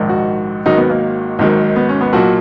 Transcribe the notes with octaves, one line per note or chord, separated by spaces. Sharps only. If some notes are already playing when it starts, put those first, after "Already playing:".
Already playing: A#1 G#2 D#3
F#4
G#1 G#2 D#3 F#3 D#4
B3
A#3
G#1 G#2 D#3 F#3
B3
C#4
B3
B1 A#2 F#3 F#4